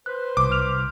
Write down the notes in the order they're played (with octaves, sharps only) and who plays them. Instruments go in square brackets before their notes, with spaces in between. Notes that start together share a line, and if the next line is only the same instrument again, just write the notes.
[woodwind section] B4 C5 [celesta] F#6
[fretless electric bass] C2 [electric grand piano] D6
[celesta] F6 F7